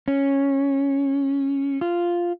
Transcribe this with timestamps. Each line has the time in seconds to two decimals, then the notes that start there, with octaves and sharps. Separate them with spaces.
0.08 C#4
1.81 F4